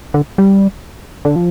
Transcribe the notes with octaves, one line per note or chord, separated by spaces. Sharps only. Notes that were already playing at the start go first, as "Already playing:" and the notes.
D3
G3
D3
F3